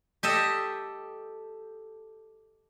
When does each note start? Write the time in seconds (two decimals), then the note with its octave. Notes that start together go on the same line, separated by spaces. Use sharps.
0.23 G4 A4 D#5 E5